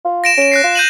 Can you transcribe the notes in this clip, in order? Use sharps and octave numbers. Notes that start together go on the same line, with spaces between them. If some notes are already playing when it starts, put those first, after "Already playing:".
F4
A#6 D7 E7
C#4 D7 E7
F#6 A#6 C7
F4
G6 D#7 F#7